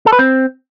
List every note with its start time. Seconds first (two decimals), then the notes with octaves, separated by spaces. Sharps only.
0.06 A4
0.13 B4
0.19 C4